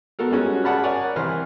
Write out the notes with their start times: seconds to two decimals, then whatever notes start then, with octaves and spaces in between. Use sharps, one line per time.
0.19 B3 F#4 A4 A#4
0.31 G3 G#3 C#4 F#4
0.64 G#4 D5 F#5 A5 B5 F6
0.83 A#4 C#5 D5 F#5 G#5
1.16 C2 E3 B4 C5 F6